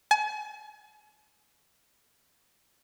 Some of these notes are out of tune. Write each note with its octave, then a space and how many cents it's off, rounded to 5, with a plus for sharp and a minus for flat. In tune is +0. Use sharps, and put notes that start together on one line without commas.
G#5 +40